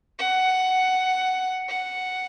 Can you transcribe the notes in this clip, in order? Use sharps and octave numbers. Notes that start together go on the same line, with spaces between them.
F#5
F#5